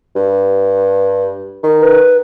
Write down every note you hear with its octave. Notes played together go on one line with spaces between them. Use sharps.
G2
D#3
B4